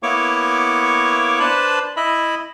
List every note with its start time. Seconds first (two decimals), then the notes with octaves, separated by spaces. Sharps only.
0.03 A#3 B3 E4 C#5 C#6 D6
1.40 D4 B4 C5 A5 B5
1.97 E4 D#5 E5 B5